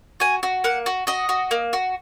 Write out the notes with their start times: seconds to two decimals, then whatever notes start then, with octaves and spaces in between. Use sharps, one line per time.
0.20 F#4 G#5
0.43 F#4
0.64 A#3 F#5
0.86 F#4
1.07 F#4 D#5
1.29 F#4
1.51 A#3
1.73 F#4